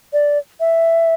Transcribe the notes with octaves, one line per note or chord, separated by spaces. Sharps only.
D5
E5